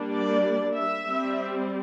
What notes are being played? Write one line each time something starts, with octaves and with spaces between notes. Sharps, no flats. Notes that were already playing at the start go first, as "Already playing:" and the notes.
Already playing: G3 A#3 D4
D5
E5
G3 C4